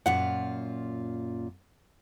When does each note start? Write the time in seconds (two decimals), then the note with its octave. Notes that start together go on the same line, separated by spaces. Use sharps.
0.06 F#2 A#2 F4 F#5